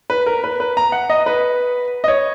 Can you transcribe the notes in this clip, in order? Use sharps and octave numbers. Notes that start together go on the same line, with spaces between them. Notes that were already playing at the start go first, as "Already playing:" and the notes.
B4
A#4
B4
B4
A#5
F#5
D#5
B4
D#5
C#5